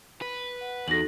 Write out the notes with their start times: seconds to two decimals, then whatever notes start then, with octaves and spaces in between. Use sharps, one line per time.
0.22 B4
0.61 F#5
0.88 E2 D#4 F#4 A4 A#6 F#7